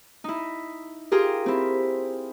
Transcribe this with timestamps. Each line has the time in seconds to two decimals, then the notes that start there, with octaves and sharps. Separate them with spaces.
0.24 D#4 E4
1.12 F4 G4 G#4 A#4
1.46 C4 E4